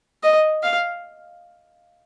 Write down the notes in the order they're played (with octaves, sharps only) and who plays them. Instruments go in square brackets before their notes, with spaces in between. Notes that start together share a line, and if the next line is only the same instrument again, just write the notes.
[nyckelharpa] D#5
F5